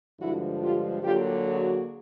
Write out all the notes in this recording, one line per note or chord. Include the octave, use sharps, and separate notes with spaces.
G2 D3 F3 G#3 E4 F#4
F4 G4
D3 F#3 A#3 F4 G4
F#4 G#4